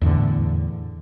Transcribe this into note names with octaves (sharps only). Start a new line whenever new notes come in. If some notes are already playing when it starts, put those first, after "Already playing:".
E2 A2 D3